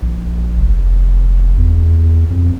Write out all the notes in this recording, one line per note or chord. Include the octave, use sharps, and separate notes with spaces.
A#1
F1
E2
F2